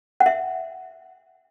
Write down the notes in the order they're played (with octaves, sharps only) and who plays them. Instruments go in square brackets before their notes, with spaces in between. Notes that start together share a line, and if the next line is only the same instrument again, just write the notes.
[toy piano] F#5
E5